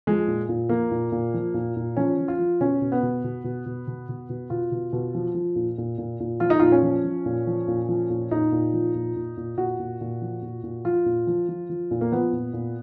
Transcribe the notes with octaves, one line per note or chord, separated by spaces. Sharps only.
F3 G#3
A#2
A#2
F3 A#3
A#2
A#2
F3
A#2
A#2
F3 C#4
F3
F4
F3
B2 C#4
B2
B3
B2
B2
B2
B2
B2
B2
B2
B2 F4
B2
B2
F3
F3
A#2
A#2
A#2
A#2
F3 F4
D#4
A#2 F4
C#4
F3
F3
A#2
F3
A#2
F3
A#2
A#2 D#4
A#2
F3
A#2
A#2
A#2
A#2 F#4
A#2
A#2
F3
A#2
A#2
F3 F4
A#2
F3
F3
F3
A#2
A#3
F3 B3
A#2
A#2